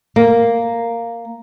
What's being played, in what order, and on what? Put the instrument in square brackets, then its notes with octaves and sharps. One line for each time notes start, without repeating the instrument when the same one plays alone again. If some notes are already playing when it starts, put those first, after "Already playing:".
[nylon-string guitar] A#3